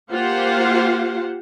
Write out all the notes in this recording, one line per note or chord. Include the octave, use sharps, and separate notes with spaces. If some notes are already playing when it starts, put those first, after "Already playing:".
A#3 F4 G4 C5 F5 F#5